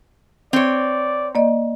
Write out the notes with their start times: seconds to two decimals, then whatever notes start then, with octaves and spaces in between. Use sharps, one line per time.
0.53 C4 C#5 D5
1.35 A#3 D5 D#5